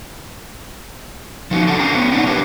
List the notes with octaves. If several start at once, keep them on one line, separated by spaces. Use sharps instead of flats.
F3 D#4 F#4
C#4 D4 A4 F#5 A5
D3 D4 F#4 A4 G5 A#5
B3 C#4
B3 D4 D#4 C#5 F#5
D4 G4 A#4 B4